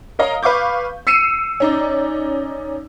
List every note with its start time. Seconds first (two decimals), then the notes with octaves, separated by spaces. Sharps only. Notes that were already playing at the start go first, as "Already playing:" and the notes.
0.19 A#4 C#5 D#5 F5 A#5
0.43 B4 F5 C#6 D6 G6
1.07 E6 C7 C#7 D#7 E7
1.60 C#4 D#4 D5